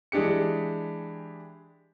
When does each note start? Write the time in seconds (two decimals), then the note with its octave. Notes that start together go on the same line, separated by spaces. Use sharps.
0.12 E3 G#3 D4 G4 C#7